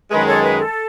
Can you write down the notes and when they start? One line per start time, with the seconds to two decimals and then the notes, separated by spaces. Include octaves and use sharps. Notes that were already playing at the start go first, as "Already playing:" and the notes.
0.11 F#2 D#3 G#3 B4
0.27 A4 C#5
0.42 B4
0.58 A4